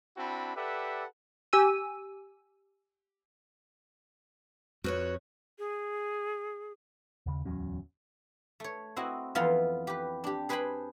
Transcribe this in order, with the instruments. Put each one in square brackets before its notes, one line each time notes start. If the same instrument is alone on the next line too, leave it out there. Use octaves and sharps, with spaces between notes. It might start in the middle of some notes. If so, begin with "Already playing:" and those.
[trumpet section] C4 D4 E4 F#4 A5 B5
G4 A4 B4 D5 E5 F#5
[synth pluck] G4 G#5 E6 D#7
[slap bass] F2 [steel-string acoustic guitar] F#4 B4 C#5
[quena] G#4
[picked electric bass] D#2 C#3
D1 E2 F#3 C#4
[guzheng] A3 C#5
C4 E4 F#4 D#5
F2 E3 B3 F4 F5 C6
G4 B4
D4 G4
G#4 B4 C5 G5 G#5 B5